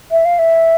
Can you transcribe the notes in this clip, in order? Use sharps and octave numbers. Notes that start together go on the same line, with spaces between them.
E5
F5
E5